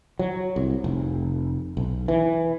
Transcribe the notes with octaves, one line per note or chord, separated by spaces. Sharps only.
F#3
C2
F1
B1
E3